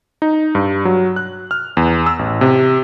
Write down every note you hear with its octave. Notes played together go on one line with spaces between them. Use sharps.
D#4
G2
F#3
F#6
F6
E2
E6
A1
C3